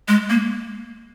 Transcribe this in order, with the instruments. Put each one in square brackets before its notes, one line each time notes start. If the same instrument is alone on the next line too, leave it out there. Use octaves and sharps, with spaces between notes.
[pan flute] G#3
A#3